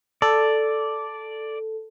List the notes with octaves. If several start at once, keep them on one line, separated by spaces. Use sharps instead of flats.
A4 D5